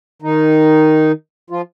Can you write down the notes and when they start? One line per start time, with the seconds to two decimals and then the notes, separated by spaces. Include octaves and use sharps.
0.22 D#3 D#4
1.50 F3 F4